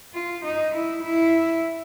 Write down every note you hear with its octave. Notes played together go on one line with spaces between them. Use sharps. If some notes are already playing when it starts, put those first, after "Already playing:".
F4
D#4
E4
E4